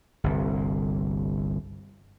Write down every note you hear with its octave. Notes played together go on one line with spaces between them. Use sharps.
G1 C2